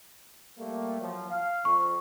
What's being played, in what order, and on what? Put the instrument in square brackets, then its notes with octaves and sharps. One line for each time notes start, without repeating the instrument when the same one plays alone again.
[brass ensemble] G3 A3 A#3
F3 F#3
F5
[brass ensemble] F2 [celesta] C#6